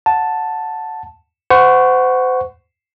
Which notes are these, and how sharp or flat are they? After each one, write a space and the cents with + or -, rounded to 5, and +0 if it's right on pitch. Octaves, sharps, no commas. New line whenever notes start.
F#5 -15 A5 +0
C5 -35 F#5 +0 C#6 +0